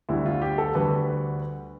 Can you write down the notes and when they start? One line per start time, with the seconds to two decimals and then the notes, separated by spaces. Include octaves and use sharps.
0.09 D2 D3 G3 E4
0.26 F4
0.42 G4
0.58 A4
0.75 D2 D3 G3 B4